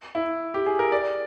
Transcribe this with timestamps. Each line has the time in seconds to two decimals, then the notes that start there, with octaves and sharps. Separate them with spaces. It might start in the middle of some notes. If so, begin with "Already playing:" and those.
0.15 E4
0.54 G4
0.66 G#4
0.79 A#4
0.92 D5